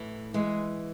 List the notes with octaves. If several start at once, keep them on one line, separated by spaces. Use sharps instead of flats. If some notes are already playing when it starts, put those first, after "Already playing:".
Already playing: A2 E3
E3 G#3